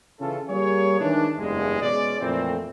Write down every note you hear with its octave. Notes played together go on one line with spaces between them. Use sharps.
C#3 E3 C#4 F4 A4
G3 A#3 G#4 C#5
D#3 E3 G#3 D4
F#1 E2 G2 G#3
B2 G#3 C#4 D5
F2 A#2 E3 A3 C4